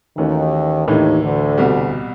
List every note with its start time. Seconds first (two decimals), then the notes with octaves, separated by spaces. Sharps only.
0.17 D#2 D#3 E3 A3 C#4 F#4
0.87 D#2 A2 D#3 E3 A3 D4
1.22 D2 D3
1.58 C2 B2 G3